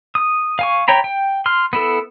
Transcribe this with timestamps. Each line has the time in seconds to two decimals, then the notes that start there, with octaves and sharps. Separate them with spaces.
0.15 D#6
0.59 F5 G#5 C#6
0.88 C#5 G5 A#5 B5
1.04 G5
1.46 C6 F6
1.73 B3 E4 A4